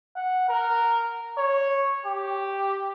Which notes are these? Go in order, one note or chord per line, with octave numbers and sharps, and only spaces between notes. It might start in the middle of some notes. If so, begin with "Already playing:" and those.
F#5
A#4
C#5
G4